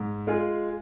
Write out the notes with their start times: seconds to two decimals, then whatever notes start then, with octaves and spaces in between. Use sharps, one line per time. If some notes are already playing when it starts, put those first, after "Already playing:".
Already playing: G#2
0.27 G#3 F4 G#4